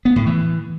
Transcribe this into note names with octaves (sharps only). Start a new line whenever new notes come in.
B3
A2
E3